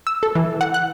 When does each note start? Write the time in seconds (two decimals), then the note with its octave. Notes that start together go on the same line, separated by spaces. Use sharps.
0.07 E6
0.23 A4
0.35 E3
0.61 F#5
0.74 F#6